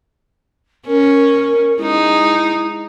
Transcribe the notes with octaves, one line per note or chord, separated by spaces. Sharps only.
C#4 A#4
G#3 D#4 E4